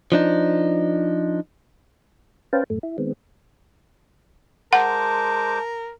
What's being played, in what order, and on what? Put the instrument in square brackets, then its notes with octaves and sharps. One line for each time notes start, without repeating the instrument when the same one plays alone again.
[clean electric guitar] F3 D4 D#4
[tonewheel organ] C#4 B4 C5 F5 G5 A5
F#2 A2 A3
E4
D#3 G#3 B3 C4
[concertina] G#3 C5 D6 [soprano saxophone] A#4 [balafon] F#5 [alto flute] A5